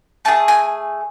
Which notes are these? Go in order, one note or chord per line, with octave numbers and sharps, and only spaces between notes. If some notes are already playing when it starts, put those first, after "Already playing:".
A3 E4 G#4 A5
G#5